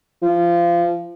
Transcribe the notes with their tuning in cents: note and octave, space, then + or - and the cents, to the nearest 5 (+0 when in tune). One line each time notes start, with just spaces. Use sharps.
F3 -20